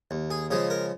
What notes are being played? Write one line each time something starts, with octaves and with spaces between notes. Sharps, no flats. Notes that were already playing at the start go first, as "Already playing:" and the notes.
D#2
G#4
C#3 F3 G#3 G#4
A#4